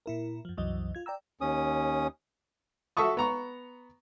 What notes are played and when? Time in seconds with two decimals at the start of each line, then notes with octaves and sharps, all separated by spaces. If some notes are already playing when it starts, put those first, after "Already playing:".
0.06 A#2 E4 A#4
0.45 F#2 F3
0.57 C2 F#2 E3 F#3 D#5
0.95 F4 G#6
1.06 D5 G5 A#5 E6
1.41 D#2 C#4 D#6
2.97 F#4 A4 E5 A5 C#6 D#6
3.17 B3 A#5 C#6